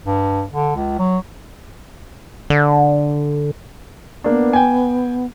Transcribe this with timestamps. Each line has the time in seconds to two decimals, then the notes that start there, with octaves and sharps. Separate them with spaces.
0.05 G2
0.51 D3
0.75 C#2
0.99 F#3
2.50 D3
4.24 A#3 B3 D4
4.53 G5 G#5